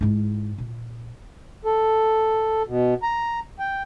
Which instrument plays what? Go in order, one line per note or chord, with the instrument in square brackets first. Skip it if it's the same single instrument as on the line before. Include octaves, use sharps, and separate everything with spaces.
[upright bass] G#2 E4
A#2
[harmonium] A4
B2
A#5
G5